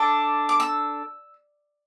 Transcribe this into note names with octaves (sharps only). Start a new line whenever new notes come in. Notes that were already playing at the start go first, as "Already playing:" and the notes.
Already playing: D4 A4 D6
D6
E6